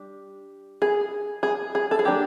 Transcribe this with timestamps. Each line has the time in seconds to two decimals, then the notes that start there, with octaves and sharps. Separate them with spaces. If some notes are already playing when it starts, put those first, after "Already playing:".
Already playing: G3 D4
0.82 G#4
1.43 G#4
1.75 G#4
1.91 A4
1.99 G#4
2.05 D#3 F#3 A#3 D4 G4